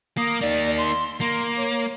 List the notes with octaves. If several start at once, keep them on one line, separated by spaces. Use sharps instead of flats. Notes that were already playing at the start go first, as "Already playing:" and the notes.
A#3 D#6
A#3 D#4 D5
C6
A#3 C6
C#5